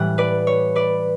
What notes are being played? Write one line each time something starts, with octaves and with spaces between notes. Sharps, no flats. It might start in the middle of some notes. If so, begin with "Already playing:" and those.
Already playing: A2 E3 G3 F#5
B4 D5
C#5
B4 D5